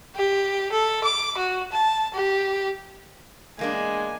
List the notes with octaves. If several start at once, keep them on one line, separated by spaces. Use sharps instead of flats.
G4
A4
D6
F#4
A5
G4
E2 G#3 A#3 D4 G#5